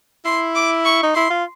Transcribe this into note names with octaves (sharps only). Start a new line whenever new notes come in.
E4 C6
D6
C#6
D#4
E4 C6
F4